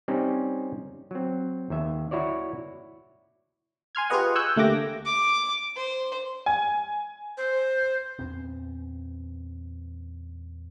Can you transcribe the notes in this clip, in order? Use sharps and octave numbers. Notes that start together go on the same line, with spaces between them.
G3 C4 C#4 D#4
F#3 C4
D#2 E5
E4 F#4 C#5 D5
G#5 C6 F6 G#6
F4 G4 G#4 B4 D#5 F#5
G#5 C#6 E6 F#6 G6
D2 A3 A#3 G4 D6 A#6
D6
C5
G#5
C5
E2 A#2 B3 C4